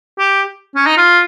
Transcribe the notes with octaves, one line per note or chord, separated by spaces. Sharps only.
G4
C#4
D#4
F4